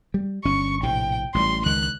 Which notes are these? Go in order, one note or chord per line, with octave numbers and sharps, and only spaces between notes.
G3
G1 C#4 C#6
A#1 A2 C3 G5
A1 G3 C6
C#2 D#3 G#3 F#6